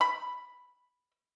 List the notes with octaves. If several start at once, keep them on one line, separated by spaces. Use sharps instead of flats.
B5